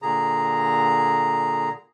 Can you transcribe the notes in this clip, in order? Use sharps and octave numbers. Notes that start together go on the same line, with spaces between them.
A#2 D3 G#4 A#5